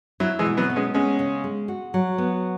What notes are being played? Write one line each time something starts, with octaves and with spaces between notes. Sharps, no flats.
F#3 E4
E3 G#3
B2
F#3 B3
B3
G#3 C#4
G#3 B3 C#4
C#3
G#3
F#4
F#3
B3